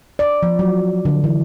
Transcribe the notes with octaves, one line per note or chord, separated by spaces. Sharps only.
D5
F3
F#3
D3
E3